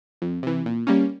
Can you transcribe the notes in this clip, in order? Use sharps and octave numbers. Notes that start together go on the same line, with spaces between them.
F2
C3 E3
A#2
G3 A#3 C#4